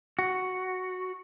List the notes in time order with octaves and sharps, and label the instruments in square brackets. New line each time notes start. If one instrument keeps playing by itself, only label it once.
[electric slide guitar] F#4